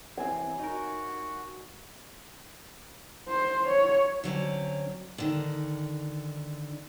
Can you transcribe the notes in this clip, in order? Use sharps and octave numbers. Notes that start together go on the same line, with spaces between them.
C2 E3 C4 G#5
D#4 F#4 A#4
C5
C#5
D3 F#3 C4 C#4
D3 D#3